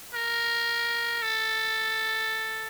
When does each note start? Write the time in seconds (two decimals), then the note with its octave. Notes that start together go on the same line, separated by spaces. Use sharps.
0.15 A#4
1.22 A4